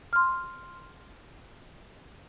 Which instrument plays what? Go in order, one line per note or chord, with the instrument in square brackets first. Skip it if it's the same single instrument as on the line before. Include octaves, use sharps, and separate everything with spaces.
[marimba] C6 F6